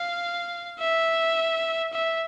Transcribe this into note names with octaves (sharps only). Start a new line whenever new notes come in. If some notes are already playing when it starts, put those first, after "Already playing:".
Already playing: F5
E5
E5